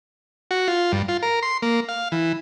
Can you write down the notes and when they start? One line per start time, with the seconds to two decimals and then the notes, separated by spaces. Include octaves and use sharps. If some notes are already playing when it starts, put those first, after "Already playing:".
0.51 F#4
0.68 F4
0.92 G2
1.08 F4
1.23 A#4
1.43 C6
1.62 A#3
1.89 F5
2.12 E3